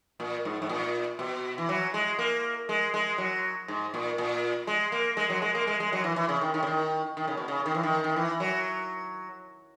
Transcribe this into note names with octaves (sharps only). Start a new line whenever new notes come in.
A#2
G#2
G#2
A#2
B2
E3
F#3
G#3
A#3
G#3
G#3
F#3
G#2
A#2
A#2
G#3
A#3
G#3
F#3
G#3
A#3
G#3
G#3
F#3
E3
E3
C#3
D#3
D#3
C#3
D#3
D#3
C#3
B2
C#3
D#3
E3
D#3
D#3
E3
F#3